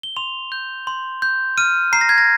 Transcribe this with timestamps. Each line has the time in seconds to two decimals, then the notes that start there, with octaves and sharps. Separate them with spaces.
0.03 G7
0.16 C6 F7
0.52 G6
0.87 C6
1.22 G6
1.58 F6 D#7
1.93 A#5 C7
2.01 A#6
2.09 G#6
2.18 A#6